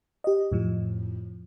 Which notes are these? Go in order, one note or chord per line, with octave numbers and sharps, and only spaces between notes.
G4 D#5
F2 A2 F3